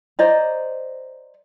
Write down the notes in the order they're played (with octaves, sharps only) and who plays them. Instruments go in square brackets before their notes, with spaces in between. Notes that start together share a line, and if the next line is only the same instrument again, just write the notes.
[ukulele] C5 D5 D#5 A#5